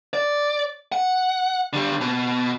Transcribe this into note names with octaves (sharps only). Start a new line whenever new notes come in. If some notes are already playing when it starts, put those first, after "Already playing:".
D5
F#5
D3 G3
B2